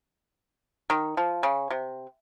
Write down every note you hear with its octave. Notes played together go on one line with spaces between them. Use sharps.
D#3
F3
C#3
C3